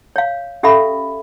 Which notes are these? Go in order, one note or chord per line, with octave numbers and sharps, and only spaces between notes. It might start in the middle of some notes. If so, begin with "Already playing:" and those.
C#5 F5
C#4 G4 A4 E5 F5 B5